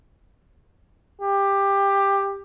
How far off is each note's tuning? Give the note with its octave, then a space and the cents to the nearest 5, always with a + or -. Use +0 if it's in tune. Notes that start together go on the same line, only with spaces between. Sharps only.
G4 +15